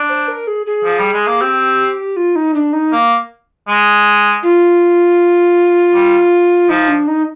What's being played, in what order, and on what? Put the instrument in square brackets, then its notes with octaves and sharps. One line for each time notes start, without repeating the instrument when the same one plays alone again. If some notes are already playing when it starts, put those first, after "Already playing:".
Already playing: [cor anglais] D4
[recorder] C5
A#4
G#4
G#4
[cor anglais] F3
G3
G#3
A#3
[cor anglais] C4 [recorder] G4
[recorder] F4
D#4
D4
D#4
[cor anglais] A#3
G#3
[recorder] F4
[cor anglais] G3
[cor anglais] F3 [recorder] D#4
[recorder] D4
D#4